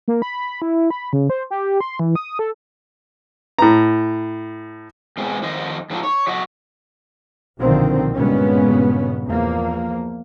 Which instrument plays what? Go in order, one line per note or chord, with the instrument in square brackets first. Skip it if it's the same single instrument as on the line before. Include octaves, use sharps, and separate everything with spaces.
[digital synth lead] A#3
B5
E4
B5
C#3
C5
G4
C6
E3
D#6
A4
[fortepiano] A2 A#5
[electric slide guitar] B2 G#3 C4 D#4 G#4
F2 D#3 C5 D#5
G#2 F3 F#3 D#4 F4 A4
C#5
F#3 F#4 D#5
[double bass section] B1 A#2 D3 D#3 F3 C4
G2 A#2 C#3 G#3 B3 C#4
E2 F3 A#3